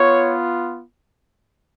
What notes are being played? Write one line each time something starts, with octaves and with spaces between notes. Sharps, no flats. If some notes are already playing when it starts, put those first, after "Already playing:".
Already playing: B3 F4 C#5